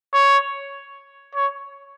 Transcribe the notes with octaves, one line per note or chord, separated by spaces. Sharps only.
C#5
C#5